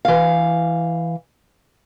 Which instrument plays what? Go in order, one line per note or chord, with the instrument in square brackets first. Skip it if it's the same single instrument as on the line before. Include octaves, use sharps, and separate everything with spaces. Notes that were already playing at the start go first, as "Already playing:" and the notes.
[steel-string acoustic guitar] E3 F5